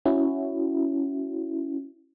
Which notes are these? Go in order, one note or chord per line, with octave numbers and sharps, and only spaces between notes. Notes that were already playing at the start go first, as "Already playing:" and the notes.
C#4 E4 F#4